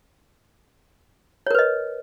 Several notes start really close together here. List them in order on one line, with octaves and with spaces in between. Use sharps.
C#5 A#4 B4 D#5